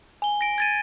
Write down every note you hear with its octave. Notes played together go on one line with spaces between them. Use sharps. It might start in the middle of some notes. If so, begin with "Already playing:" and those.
G#5 G7
A#6 D7
G#6 A6 D#7